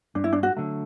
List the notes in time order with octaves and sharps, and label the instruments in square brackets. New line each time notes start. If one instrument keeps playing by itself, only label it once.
[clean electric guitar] G2 [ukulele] D4
[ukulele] E4
D4
F#4
[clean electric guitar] D3 F#3 A3